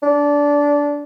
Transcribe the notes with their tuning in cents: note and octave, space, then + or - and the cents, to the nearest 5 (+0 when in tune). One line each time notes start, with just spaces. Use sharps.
D4 -20